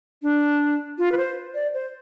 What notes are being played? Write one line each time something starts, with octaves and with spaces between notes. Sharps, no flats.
D4
F4
B4
C5
D5
C5